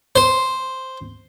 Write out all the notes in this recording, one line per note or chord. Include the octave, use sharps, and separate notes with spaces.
C5